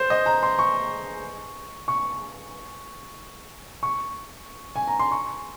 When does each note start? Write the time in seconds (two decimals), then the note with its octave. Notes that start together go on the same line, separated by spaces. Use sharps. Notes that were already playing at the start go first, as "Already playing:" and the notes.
Already playing: C5
0.10 D#5
0.26 A#5
0.43 C6
0.59 C#6
1.88 C#6
3.83 C#6
4.76 G#5
4.88 A#5
4.99 C6
5.11 C#6